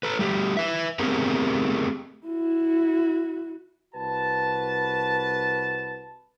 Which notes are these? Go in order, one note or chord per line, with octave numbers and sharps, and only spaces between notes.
A4 B4
G3 A3 G4
B4 E5
A3 B3 C4 G4 G#4 A#4
E4 F#4
C2 F#4 B4 A5